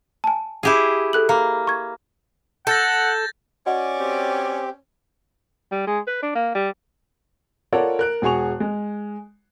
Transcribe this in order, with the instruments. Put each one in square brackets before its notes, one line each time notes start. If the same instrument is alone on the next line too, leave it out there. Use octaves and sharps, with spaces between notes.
[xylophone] G#5 A5
[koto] E4 G4 G#4
[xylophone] A4 F#6 F#7
[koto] A#3
[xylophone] C#6 G#6
[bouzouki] A4 [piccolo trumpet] F#5 [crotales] G6 A6 A#6
[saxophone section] C#4 D5 [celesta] F#4 D#5 F#5
[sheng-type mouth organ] C4 G4
[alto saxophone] G3
G#3
B4
D4
A#3
G3
[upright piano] F4 A4 A#4 C#5 D5 F#5
A#4 F#6 D7
E1 F#4 G#4 C#6 F7
G#3